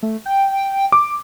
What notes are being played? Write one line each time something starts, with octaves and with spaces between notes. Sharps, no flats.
A3
G5
D6